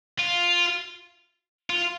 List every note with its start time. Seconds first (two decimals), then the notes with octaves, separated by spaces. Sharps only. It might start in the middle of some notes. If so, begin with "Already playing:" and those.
0.19 F4
1.70 F4